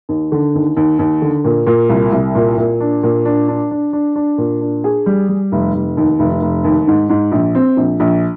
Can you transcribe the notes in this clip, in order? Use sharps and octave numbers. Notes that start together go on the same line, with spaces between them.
D#2
D3
D#2
D#2
D#2
D3
A#2
A#2
C2
C2
A#2
A#2
D4
A#2
D4
D4
D4
D4
D4
A#2
D4
G#4
G3
G3
F1
F1
D#2
F1
F1
D#2
G#2
G#2
A#1
C4
A#1
A#1